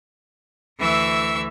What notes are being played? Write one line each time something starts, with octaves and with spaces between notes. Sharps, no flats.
D2 E3 E5 C#6 E6